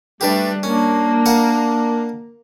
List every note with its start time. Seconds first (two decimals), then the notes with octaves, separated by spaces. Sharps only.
0.21 G3 A3 D4 G4 B4 D5
0.63 A#3 C#4 D4
1.26 A#4 F5 F#5